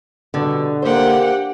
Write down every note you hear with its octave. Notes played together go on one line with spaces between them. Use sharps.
B2 D3 G3
A#3 G4 C5 F#5 G5